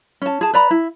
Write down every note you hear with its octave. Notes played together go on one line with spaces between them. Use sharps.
C#4 A5
G#4 A5
B4 D5 A#5 B5
E4